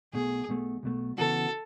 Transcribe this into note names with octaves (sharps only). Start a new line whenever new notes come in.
B1 B2 A3 G#4
B1 B2 A3
B1 B2 A3
C#3 E3 B3 F#4 A4